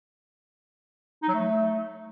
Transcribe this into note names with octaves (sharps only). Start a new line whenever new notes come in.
D#4
F#3
A3